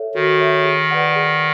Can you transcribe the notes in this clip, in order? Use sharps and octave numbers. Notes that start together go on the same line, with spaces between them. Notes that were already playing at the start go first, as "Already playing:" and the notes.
Already playing: A4 C#5 E5
D#3 F#4
A4 C#5 E5
G#4
B4 D5 F#5
G#4